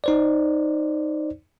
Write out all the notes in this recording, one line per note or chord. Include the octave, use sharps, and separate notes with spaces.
D#4 C5 D5